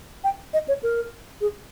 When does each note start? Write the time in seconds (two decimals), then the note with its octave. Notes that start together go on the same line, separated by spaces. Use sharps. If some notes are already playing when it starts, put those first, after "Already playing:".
0.24 G5
0.54 D#5
0.68 C#5
0.83 A#4
1.41 G#4